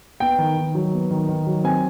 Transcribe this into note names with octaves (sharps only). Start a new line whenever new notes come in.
B3 G5
D#3
D#3
F#3
B3
D#3
D#3
F#3
C4 G#5